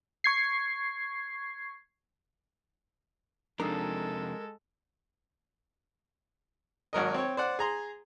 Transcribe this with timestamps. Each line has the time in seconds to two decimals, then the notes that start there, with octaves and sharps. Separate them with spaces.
0.24 C#6 G#6 C7
3.60 F2 C3 G#3 D4 D#4 F4 A4 A#4
6.93 G#1 F#3 A#4 D#5
7.14 C4 C#5
7.37 C5 D5 F#5
7.59 G#4 A#5 C6